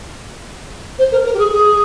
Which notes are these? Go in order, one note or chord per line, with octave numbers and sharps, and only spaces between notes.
C5
A#4
A#4
G4
G#4
G#4